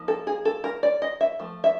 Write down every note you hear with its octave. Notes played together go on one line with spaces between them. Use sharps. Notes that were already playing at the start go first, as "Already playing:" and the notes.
Already playing: F3 A#3 D#4
A4
G#4
A4
A#4
D5
D#5
E5
F3 A3
E5